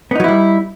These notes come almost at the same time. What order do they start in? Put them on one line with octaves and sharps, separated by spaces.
B3 D#4 F#3 E4 G3